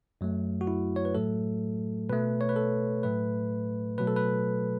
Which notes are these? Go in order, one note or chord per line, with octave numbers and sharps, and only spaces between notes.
F#2 F#3 A3
F#4
E4
C#5
B4
A2 F#3 A3 A4
B2 A3 B4
C#5
B4
A4
A2 F#3 A3 B4
B2 F#3 A3 B4
A4
B4